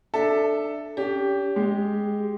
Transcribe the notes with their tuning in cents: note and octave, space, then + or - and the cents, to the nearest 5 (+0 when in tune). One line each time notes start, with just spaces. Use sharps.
D4 +15 A4 +0 E5 +0
C#4 +45 G4 +5
G#3 +0 G4 +0